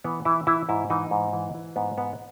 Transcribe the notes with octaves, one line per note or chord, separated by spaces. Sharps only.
E3 B3
E3 E4
E3 E4
G#2 E4
E3 D#4
G#2
E3
E3
G#2 B3
E3 B3